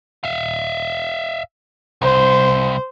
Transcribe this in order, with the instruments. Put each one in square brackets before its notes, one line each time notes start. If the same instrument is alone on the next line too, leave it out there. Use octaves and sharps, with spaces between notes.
[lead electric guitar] E5 F5
[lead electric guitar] C2 [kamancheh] C5